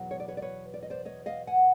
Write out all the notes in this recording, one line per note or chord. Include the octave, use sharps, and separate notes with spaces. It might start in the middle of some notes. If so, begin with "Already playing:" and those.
Already playing: E2 B2 F#3
C#5
D5
B4 C#5
D5
B4 C#5
D5
D#5
C5 D5
C#5 D#5
D#5 F5
F#5 G#5